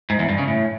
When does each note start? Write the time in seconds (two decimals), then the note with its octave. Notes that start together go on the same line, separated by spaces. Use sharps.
0.10 G#2
0.19 E2
0.29 G2
0.38 C#3
0.48 A2